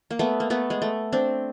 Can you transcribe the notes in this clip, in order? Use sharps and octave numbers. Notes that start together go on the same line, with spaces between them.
A#3
A3 B3
A#3
A3 B3
G#3
A3
C4 D4